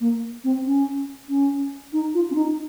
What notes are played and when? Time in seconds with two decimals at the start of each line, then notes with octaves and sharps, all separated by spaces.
0.01 A#3
0.44 C4
0.65 C#4
1.29 C#4
1.93 D#4
2.14 F4
2.30 C#4
2.35 D#4